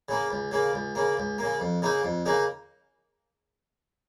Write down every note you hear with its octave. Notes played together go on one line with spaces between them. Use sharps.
C#3 A#3
C#2
C#3 A#3
C#2
C#3 A#3
C#2
C#3 A#3
F2
C#3 A#3 D#4
F2
C#3 A#3 D#4